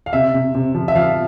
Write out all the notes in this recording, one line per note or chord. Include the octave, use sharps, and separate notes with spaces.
F5
C3 E5
C3
C3
F3
E5
F3 F5